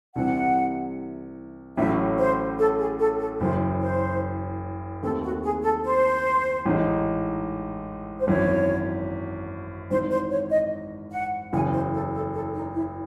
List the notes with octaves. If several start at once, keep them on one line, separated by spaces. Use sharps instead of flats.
C2 C3 E3 C4 F#5
A1 A2 F#3 C#4 E4 E5
C5
A4
G#4
A4
A4
F#1 F#2 E3 C5
C5
D#2 D#3 A3 C4 A4
F#4
G#4
A4
C5
A1 G#2 E3 G#3 D#4
C5
G#1 F#2 E3 C#5
G#1 G#2 E3 C5
C5
C#5
D#5
F#5
F#1 E2 C#3 E3 G#5
C5
A4
A4
A4
D#4
E4